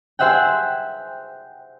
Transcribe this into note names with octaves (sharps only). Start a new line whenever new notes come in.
G#4 C5 E5 F#5 G5